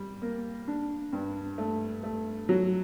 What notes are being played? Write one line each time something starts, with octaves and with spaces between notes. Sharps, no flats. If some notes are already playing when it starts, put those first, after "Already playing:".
Already playing: G3
A#3
D4
G2
A3
A3
F#3